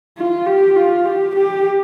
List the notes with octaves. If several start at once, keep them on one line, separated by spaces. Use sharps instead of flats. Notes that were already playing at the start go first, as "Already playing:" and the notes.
F4
G4
F4
G4
G4